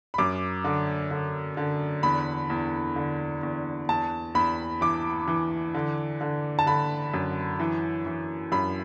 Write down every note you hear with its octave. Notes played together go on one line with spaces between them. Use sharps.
B5
F#2 D6
D3
D3
D3
E2 B5
E2
D3
E2
E2 A5
E2 B5
E3 D6
E3
D3
D3
A5
D3 B5
F#2
E3
E3
F#2 B5